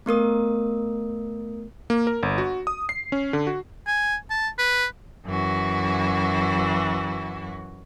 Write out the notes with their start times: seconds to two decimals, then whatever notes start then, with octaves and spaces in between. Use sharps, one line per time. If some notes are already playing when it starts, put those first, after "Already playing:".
0.06 A3 B3 A#4 D#6
1.90 A#3
2.07 A#4
2.23 G1
2.38 F#4
2.67 D#6
2.89 C7
3.12 C#4
3.33 D3
3.47 F#4
3.87 G#5
4.30 A5
4.58 B4
5.25 F#2 E3 F#4